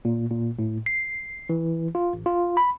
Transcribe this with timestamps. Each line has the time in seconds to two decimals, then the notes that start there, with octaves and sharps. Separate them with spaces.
0.05 A#2
0.30 A#2
0.59 A2
0.86 C7
1.49 E3
1.95 F4
2.13 A1
2.26 F4
2.57 B5